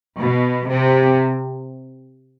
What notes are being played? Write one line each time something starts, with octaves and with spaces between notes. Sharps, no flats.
B2
C3